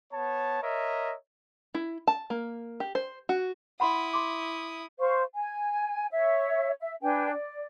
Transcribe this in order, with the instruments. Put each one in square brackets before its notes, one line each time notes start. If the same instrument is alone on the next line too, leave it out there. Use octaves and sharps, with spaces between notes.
[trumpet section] B3 C#5 A5
A#4 C#5 D#5 E5
[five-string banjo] E4
A5
A#3
G4
C5
F#4
[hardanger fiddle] E4 D#6 [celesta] F#5 B5 C6
[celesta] C6 D6
[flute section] C5 F5 C#6
G#5
C#5 E5
E5
D4 B4 G5 G#5
D5